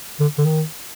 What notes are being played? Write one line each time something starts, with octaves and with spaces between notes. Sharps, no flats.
D3
D3
D#3